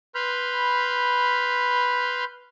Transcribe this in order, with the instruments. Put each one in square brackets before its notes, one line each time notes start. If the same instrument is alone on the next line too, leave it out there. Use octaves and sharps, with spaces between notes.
[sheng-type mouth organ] B4 B5 C6 F6 G6